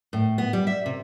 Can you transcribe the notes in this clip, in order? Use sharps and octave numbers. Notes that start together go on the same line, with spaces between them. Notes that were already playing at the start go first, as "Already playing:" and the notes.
A2
B3
G3
E5
C3